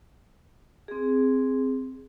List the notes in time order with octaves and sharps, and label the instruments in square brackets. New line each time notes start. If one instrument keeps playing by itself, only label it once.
[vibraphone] C4 G#4